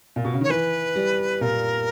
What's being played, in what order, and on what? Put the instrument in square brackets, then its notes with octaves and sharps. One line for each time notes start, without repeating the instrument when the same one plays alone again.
[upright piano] A#2
B2
C#3
[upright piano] D#3 [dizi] C#5
[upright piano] E3 [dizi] B4
[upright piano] G3
[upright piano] A#2 [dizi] A#4